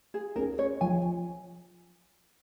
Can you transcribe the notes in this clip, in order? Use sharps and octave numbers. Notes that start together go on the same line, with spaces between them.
G#4
C#4 G#4 A#4
C#5
F3 G#5